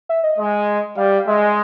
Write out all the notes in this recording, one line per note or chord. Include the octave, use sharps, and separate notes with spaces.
E5
D#5
G#3
G3 F5
F5
G#3 E5
D#5